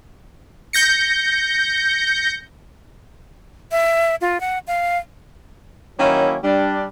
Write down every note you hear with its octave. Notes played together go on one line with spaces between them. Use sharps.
G6 A#6 C#7
E5
F4
F#5
F5
D#3 F#3 A#3 C#4 E4
G3 D4